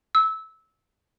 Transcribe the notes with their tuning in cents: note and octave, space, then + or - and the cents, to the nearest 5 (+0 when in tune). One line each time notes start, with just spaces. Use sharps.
E6 -20